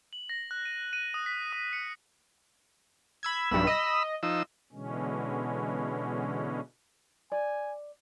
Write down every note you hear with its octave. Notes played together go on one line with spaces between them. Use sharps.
F#7
A#6
F#6
D#7
D#7
D#6
B6
D#6
C#7
B5 E6 G#6
B1 G2 B5 E6
D#5
F3 D#4 E6
B2 D3 E3 G#3 C#4
D5 G#5